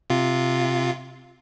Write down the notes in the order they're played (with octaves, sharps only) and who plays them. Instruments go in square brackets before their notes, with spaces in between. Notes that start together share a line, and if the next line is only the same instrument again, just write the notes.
[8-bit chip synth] C3 F4